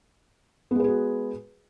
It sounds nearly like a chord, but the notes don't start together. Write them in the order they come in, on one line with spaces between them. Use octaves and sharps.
B3 G#3 B4 G#4 F#4